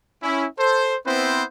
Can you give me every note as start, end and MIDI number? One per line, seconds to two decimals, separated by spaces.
0.22 0.46 61
0.22 0.46 64
0.58 0.96 69
0.58 0.96 72
1.06 1.43 59
1.06 1.43 60
1.06 1.43 64
1.06 1.43 71
1.06 1.43 72